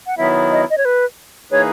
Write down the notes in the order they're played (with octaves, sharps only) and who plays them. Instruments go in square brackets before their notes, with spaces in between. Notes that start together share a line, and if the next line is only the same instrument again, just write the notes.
[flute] F#5
[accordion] D#3 F#3 B3 E4 [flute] E5
[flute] D#5
D#5
C#5
B4
[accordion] E3 A#3 D#4 G#4 B4 [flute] C#5